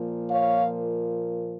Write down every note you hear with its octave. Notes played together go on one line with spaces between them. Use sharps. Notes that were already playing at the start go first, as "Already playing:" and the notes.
Already playing: A#2 F3 A#3
C#5 F5